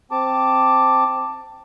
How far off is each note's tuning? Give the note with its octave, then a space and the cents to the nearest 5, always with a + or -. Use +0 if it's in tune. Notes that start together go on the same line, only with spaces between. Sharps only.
C4 +0 A5 +10 D6 +0